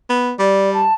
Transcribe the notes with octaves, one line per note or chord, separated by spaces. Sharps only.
B3
G3 D5
A5